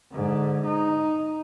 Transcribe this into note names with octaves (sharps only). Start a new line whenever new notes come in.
G#2 D3
D#4